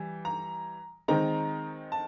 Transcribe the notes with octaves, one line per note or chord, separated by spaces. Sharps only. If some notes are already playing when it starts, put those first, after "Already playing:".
Already playing: E3 G3
A#5
D#3 G#3 C4 D#4 A#5
A5